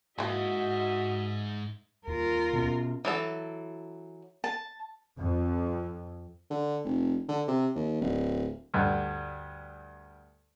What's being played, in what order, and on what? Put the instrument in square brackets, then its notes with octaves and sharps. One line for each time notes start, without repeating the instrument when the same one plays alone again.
[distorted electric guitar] G#2 [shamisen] E3 A#3 [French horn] F#4 [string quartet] D#5 E5
[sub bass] D#2 [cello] F4 A#4
[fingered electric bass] B2 B3 C#4
[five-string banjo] E3 F#3 A4
[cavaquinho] A5
[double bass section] F2
[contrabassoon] D3
F1
D3
C3
D#2
D1
[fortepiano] D2 G2